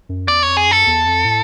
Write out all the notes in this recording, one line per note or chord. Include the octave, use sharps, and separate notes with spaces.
F#2
E2 D5
C#5
F2
G#4
F#2 A4
E2
F2
A2